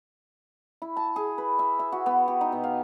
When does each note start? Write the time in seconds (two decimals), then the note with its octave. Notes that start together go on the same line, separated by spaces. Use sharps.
0.82 E4
0.97 A5
1.16 G#4
1.38 B4
1.59 E5
1.79 E5
1.92 F#4
2.06 B3
2.28 G4
2.41 D#4
2.52 B2
2.64 F5